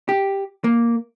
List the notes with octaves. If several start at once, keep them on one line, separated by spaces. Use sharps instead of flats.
G4
A#3